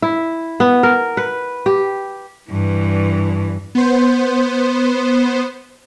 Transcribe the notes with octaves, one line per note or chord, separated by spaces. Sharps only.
E4
B3
A#4
B4
G4
G2 E3
B3 C5